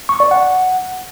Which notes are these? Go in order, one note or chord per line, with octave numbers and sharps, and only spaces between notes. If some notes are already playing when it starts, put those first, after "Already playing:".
C#6
D5
F#5